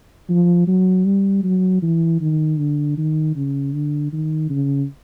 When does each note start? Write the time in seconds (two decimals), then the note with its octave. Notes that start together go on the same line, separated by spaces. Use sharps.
0.29 F3
0.67 F#3
1.05 G3
1.43 F#3
1.82 E3
2.21 D#3
2.58 D3
2.97 D#3
3.36 C#3
3.74 D3
4.12 D#3
4.50 C#3